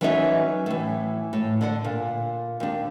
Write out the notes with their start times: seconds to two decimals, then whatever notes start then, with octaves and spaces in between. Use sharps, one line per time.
0.01 E3 F#3 C#4 D#4 B4 E5
0.66 A2 E3
1.33 A2
1.61 D3 D5 F#5
1.84 A#2
2.60 D#2 D4